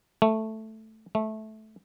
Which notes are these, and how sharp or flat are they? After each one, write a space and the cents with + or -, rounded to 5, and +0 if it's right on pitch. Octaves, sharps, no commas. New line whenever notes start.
A3 +0
A3 -15